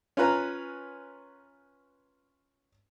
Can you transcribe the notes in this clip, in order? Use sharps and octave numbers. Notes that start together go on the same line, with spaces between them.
C#4 F4 A#4 B4 A#5